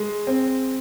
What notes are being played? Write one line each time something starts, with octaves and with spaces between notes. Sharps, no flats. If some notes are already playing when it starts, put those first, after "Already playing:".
Already playing: G#3
C4